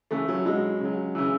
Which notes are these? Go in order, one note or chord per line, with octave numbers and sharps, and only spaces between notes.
C#3 E3 A3
F#3
B2 F#3 G#3
C#3 F#3
C#3 E3